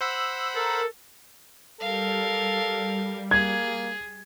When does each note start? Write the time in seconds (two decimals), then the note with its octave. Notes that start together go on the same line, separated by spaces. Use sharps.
0.01 C5 F#5 B5 E6
0.56 A4 A#4
1.80 G3 A4 A#4 F5
3.31 A#3 G#4 G#6